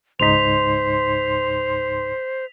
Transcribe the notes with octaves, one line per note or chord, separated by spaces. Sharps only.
C#2 G#2 D#4 C5 C6 B6 F7